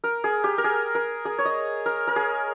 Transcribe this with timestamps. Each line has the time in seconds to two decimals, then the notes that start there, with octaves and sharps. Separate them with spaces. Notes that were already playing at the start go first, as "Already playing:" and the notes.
0.04 A#4
0.24 G#4
0.44 G4
0.58 A#4
0.64 G#4
0.95 A#4
1.25 G#4
1.39 C#5
1.45 D#5
1.86 A#4
2.07 A#4
2.16 G#4